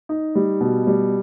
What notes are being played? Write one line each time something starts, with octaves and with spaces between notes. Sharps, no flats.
D#4
G3
B2
G3